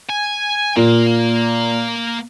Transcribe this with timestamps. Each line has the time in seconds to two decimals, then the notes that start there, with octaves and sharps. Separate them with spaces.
0.09 G#5
0.77 A#2 A#3